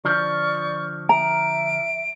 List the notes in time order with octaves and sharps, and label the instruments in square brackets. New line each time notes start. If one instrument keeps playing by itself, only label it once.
[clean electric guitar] D3 F3 [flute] D5 [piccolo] C#6
[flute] E5 [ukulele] A#5 [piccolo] D7